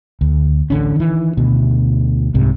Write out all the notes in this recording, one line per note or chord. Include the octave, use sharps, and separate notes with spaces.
D2
A1 D3 C#4
D#3 E3
D2 B2
C2 G#2 C3